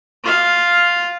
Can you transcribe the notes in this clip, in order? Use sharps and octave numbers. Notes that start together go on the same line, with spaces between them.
F4 F5